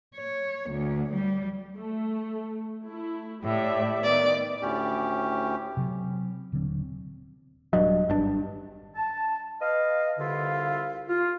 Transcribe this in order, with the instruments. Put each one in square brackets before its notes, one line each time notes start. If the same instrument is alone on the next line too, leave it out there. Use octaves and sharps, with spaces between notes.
[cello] C#5
D2
G3
[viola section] A3
A3 E4
[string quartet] A2 [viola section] G4 D5 E5
[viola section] D#3 B3 [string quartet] D5
[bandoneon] D2 A2 C#4 G4
[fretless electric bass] C3 F#3
D#1 D3 F#3 C4
[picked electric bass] D#1 G2 F#3 [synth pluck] D#5
[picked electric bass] G#1 G2 D4
[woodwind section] A5
B4 D#5 F5
C2 D3 E4 F4 F5
F4